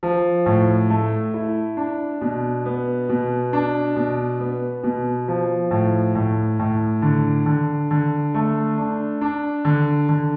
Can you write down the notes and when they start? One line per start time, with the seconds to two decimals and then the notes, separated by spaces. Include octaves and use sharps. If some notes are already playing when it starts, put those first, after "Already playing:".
0.03 F3
0.46 A2
0.90 A3
1.34 E4
1.77 D4
2.21 B2
2.65 B3
3.09 B2
3.53 D4
3.96 B2
4.40 B3
4.83 B2
5.28 F3
5.71 A2
6.15 A2
6.59 A2
7.02 D3
7.46 D3
7.91 D3
8.34 A3
8.78 D4
9.21 D4
9.65 D3
10.09 D3